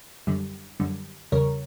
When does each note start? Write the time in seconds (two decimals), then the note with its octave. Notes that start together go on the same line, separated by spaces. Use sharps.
0.27 F#2 D3 G3
0.80 F#2 D3 G3
1.32 E2 C#3 G3 A#4 C#5